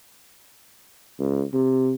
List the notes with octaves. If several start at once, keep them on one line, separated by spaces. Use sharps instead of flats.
C#2
C3